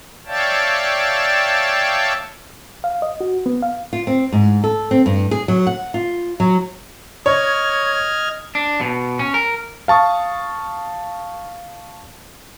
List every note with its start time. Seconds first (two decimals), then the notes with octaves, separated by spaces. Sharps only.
0.27 C#5 D5 E5 F5 G5 A5
2.84 F5
3.02 D#5
3.21 F#4
3.46 B3
3.62 F5
3.93 F4
4.07 C4
4.32 G#2
4.64 A4
4.91 C4
5.06 G2
5.31 G#4
5.48 F#3
5.67 F#5
5.94 F4
6.40 F#3
7.26 C#5 D#5 F6 G#6
8.55 D4
8.81 B2
9.19 C#4
9.34 A#4
9.88 F5 A5 C#6 D#6